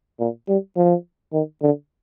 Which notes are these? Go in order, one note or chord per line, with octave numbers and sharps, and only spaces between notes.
A#2
G3
F3
D#3
D3